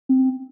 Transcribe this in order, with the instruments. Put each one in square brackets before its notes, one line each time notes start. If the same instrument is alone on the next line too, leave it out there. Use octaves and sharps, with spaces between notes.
[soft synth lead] C4